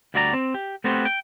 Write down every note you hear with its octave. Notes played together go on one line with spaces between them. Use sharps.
D2 G3 F#4 D5 E5 A#5
C4
G4
A3 B3 C4 F#4 G4 C5
G5